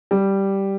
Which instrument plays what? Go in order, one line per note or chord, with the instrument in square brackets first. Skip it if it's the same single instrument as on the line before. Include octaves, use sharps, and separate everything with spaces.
[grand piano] G3